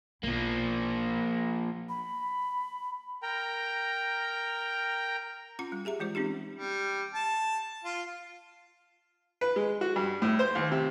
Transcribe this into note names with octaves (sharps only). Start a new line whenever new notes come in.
B1 F3 A#3 E4
B5
A#4 G5 A#5
C#4 F4 F#5 A#5
G3
G4 G#4 E5 A#5
E3 G#3 F4 C5
C4 C#4 D#4 G4
G3
A5
F4
B4
G#3
F#4
G2
A2
C5
D#2
C3